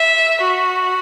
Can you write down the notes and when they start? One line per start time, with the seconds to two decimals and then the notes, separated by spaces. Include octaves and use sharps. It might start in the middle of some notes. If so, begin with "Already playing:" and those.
Already playing: E5
0.40 F#4